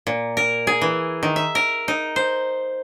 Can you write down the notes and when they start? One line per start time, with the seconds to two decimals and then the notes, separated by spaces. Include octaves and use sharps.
0.07 A#2
0.37 A#4
0.67 G#4
0.81 E3
1.23 D#3
1.36 E5
1.55 A#4
1.88 D#4
2.16 C5